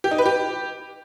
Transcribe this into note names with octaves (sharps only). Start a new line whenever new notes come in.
G4
D#4
B4
G4